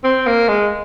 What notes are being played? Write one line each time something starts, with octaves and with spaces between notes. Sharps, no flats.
C4
A#3
G#3